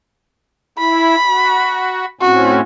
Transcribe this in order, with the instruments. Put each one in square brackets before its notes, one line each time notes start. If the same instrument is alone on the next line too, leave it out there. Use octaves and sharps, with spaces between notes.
[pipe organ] E4 [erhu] B5
[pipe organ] F#4
[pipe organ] A2 C4 C#4 [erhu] F#4